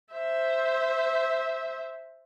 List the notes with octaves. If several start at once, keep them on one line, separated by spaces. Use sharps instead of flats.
C5 E5